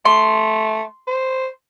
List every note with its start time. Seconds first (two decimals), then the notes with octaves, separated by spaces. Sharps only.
0.05 A3 C6
1.08 C5